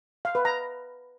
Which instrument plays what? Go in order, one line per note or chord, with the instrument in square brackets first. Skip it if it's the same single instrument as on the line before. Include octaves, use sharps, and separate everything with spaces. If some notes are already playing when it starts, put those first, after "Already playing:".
[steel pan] F5
B4
A#5